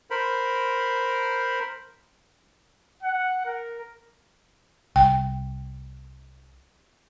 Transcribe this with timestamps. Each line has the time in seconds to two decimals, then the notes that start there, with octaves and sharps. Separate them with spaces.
0.11 A#4 C5 B5
3.03 F#5
3.46 A#4
4.96 C2 G5